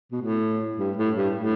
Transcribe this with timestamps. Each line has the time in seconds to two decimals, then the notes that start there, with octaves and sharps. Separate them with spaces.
0.12 B2
0.21 A2
0.77 G2
0.97 A2
1.16 G2
1.35 A2